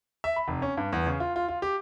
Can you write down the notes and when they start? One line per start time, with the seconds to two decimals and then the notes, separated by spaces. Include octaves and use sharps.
0.24 E5
0.36 B5
0.48 F1
0.62 C#4
0.77 G2
0.92 E2
1.06 C#3
1.20 F4
1.36 F4
1.48 F4
1.62 G4